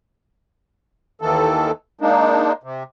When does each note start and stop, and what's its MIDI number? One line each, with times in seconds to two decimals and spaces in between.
1.21 1.71 39
1.21 1.71 51
1.21 1.71 52
1.21 1.71 69
2.01 2.52 56
2.01 2.52 58
2.01 2.52 62
2.01 2.52 63
2.63 2.83 48